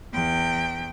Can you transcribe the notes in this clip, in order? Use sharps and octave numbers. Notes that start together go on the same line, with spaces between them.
E2 G5